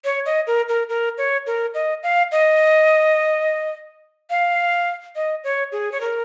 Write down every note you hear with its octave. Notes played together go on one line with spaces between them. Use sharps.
C#5
D#5
A#4
A#4
A#4
C#5
A#4
D#5
F5
D#5
F5
D#5
C#5
G#4
C#5
A#4